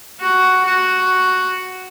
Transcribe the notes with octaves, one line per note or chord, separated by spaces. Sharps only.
F#4
F#4